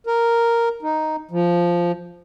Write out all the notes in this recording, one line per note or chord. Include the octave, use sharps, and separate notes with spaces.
A#4
D#4
F3